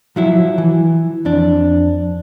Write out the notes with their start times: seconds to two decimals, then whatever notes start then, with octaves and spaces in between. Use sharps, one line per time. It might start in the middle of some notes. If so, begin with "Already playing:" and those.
0.16 F3 F#3 E4
0.58 E3
1.25 F2 D4